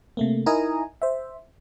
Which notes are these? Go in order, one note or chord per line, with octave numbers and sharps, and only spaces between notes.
C3 A3 A#3
D#4 E4 A#4 G#5 A#5 D#6
C5 E5